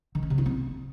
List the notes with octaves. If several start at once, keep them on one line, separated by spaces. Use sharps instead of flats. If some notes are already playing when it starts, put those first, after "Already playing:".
D#3
C#4
C3
E4
C4